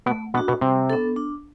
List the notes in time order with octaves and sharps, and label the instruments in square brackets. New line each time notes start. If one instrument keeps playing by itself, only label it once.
[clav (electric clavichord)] B2 B3 [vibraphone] A3
[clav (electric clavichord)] B2 B3 [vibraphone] D4
[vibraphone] F#4
[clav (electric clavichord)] B2 B3
[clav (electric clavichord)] C3 C4 [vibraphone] G3
[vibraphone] B3 D4 A4
D4